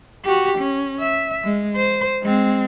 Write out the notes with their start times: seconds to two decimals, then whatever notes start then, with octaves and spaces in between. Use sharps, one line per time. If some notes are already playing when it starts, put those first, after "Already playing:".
0.25 F#4 G4
0.59 C#4
0.99 E5
1.45 G#3
1.76 C5
2.23 G#3 C4